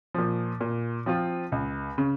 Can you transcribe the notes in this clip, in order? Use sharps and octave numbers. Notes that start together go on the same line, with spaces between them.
A#2 F3
A#2
F3 C4 F4
C#2
C#3